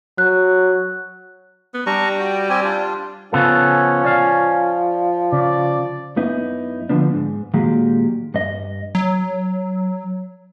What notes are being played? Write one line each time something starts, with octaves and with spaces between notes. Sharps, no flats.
F#3 F#6
B3
G3 D4 A#5 C#6
F#4 G5
C4 G4 G#5
D4 F4
C#3 F3 B3 C#4 A4
D5 F5
C#3 D5
F#2 B3 D#4 E4
D3 F3 B3 D4
G#2
A#2 D#3 F#3 G#3 G4
G2 D#5
F#3